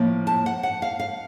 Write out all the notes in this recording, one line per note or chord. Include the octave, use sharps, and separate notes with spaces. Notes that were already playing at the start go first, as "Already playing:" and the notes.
Already playing: A2 F3 A#3
A5
F#5
F#5
F5
F5